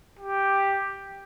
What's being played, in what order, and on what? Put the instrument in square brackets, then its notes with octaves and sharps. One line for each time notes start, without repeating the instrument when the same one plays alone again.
[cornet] G4